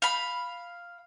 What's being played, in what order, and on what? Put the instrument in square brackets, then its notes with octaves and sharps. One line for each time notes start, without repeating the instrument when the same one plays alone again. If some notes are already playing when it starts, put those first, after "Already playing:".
[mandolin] F5 B5